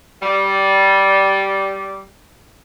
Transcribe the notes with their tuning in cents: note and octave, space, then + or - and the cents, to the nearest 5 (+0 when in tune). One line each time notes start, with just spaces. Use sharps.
G3 -10